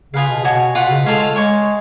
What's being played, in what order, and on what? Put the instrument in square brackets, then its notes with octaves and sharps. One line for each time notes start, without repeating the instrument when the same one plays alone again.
[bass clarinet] C#3 [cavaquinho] F4 G#4 B4 F5
[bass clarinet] B2
[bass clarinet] B2 [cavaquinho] F#4 C#5 G#5
[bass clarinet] B2 [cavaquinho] F4 B4 F#5 C#6
[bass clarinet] C#3
[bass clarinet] G#3 [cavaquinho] F4 A4 C#5 F5
[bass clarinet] G#3 [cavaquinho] C#5 G#5 C#6